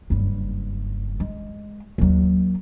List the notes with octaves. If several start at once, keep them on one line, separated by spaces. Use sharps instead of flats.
F#1 G2
G#3
D#2 F#3